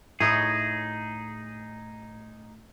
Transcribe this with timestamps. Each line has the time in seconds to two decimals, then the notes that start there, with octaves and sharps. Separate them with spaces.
0.20 A2 D#4 E4 G#4 C#5